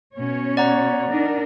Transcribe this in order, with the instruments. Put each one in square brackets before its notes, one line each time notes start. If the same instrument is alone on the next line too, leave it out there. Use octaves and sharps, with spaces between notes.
[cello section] B2 C#4 C#5
[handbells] D5 F#5 A#5
[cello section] D4 D#4 A#4